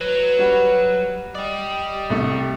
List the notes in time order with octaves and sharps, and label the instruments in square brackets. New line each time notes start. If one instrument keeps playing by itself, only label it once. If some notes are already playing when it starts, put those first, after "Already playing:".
[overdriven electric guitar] F#3 [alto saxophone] B4
[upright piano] G3 F#4
[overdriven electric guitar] G4 D5 [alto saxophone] D#5
[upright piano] C2 A3